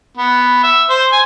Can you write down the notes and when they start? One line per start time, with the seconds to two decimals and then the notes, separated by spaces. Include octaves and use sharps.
0.17 B3
0.63 E5
0.89 C5
1.12 G#5